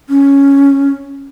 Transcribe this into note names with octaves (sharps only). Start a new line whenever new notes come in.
C#4